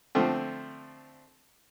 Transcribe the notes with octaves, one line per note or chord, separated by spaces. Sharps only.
D3 F3 A3 C4